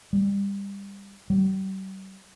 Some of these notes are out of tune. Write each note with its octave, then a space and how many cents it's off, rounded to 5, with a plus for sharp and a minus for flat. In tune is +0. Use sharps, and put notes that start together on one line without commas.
G3 +25
G3 -40